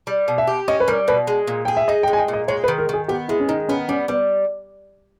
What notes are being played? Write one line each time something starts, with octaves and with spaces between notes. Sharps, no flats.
G3
B2
E5
G4
C#4 D#5
B4
G3 A#4
B2 B4
G#3
A#2
G#4 G5
E5
D#4 D#5
G5
G#3
G#5
G5
A#2
D#5
G#3 C#5
B4
D#3
A#4
D#3 G#4
B3 G4
G#3 E4
C#4
D#3 D#4
B3 C#4
G3 C#4
G3 B3